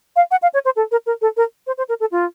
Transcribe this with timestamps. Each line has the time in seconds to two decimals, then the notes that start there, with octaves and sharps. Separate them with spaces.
0.16 F5
0.31 F#5
0.42 F5
0.54 C#5
0.65 C5
0.76 A4
0.91 A#4
1.06 A#4
1.21 A4
1.37 A#4
1.67 C5
1.78 C5
1.89 A#4
2.00 A4
2.11 F4